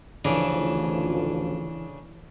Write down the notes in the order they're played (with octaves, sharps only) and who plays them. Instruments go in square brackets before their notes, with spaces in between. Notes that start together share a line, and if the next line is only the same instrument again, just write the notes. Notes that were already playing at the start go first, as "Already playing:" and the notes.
[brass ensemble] A1 D2 F3 [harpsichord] C#3 D4 [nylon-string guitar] E3